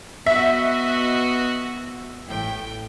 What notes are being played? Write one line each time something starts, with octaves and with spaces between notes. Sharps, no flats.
B3 F#4 D#5 E5
A1 A2 G5